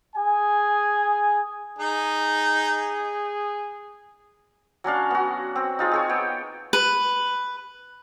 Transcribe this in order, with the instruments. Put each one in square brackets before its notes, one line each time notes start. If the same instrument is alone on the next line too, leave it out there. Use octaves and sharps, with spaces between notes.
[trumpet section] G#4 G#5
[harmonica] D#4 [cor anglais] G#4
[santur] F#3 C#4 D4 F5
B3 F#4
C4
D#4 F4 G#4
C4 G#4 C#5
B3 G5
[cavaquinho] B4